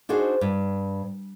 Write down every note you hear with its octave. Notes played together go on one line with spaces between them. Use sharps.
D4 D#4 F#4 G#4 C5
G2